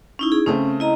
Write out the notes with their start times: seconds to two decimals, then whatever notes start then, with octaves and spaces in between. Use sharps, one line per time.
0.19 C#4 D#4 E4
0.32 G#4
0.47 C#3 A3 C4 C#4
0.80 E4 D#5 A#5